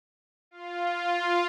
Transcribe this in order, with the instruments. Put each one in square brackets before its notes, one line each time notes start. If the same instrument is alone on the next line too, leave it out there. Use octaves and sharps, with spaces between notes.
[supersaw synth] F4